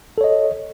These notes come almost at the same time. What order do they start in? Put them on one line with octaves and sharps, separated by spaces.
A4 C#5 D#5